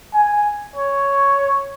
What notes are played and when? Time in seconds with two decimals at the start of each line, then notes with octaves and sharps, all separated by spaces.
0.14 G#5
0.76 C#5